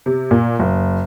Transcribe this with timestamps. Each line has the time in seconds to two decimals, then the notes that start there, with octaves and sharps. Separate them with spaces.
0.06 C3
0.31 A#2
0.59 F#1